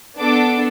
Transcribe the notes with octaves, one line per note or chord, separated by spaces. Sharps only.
B3 D4 A4 D6